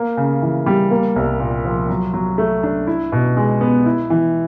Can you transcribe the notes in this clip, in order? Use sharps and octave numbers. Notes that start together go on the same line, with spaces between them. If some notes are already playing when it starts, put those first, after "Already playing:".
Already playing: A#3
C#3
E3
G3
A#3
C2
A#2
F3
F#3
F#3
A3
D4
E4
B2
G#3
B3
E4
E3